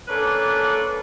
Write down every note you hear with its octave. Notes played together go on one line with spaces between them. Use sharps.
A#3 C#4 D4 A4 B4